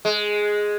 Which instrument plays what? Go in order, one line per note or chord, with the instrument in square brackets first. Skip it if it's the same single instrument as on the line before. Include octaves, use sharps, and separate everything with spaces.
[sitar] G#3